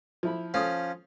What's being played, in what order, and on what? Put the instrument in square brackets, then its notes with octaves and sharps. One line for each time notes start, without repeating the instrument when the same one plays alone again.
[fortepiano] F3 E4 B5
[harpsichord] F3 C#4 F5 [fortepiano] A4 D#6